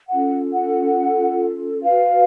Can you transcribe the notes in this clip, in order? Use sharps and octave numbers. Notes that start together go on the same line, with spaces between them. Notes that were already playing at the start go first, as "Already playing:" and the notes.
C#4 F4 A4 F#5
F#5
F#4 B4 F5